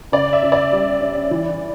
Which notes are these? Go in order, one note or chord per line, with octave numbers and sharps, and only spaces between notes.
C#3 D5
E5
C#3
D5
G3
C#4
E3